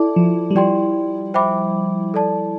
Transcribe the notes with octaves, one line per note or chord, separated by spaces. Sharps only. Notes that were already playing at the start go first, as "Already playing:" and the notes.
Already playing: E4 A4 D5 A5 D6
F3
G3
F3 G4 D5 G5 C6
C5 E5 G5 B5 D6
A4 D5 A5